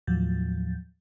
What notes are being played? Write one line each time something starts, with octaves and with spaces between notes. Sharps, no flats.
D#2 A2 F3 F#3 G6 A6